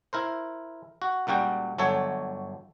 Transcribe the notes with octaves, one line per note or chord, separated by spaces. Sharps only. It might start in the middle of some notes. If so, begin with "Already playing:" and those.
E4 A#4 C5
F#4
C#2 A#2 G3 F#4 G5
G1 F#3 A4 C#5 G#5